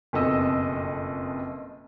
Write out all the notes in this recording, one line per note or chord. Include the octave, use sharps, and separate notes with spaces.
F#1 F2 B2 A4 D#5 E6